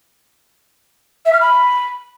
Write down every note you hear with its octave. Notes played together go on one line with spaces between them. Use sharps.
E5
F6
B5